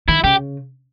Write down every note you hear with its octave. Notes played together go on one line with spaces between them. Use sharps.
D#3 E4
C#3 G4